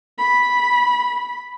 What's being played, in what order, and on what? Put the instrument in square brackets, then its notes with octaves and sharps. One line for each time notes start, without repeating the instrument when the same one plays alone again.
[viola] B5